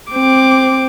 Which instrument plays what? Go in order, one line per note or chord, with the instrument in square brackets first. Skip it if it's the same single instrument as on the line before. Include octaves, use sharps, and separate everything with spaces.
[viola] C4 D6